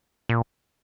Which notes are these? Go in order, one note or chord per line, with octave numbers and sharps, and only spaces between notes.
A#2